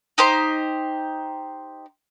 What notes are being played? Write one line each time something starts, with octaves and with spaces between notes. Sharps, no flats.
D#4 G4 C5 C6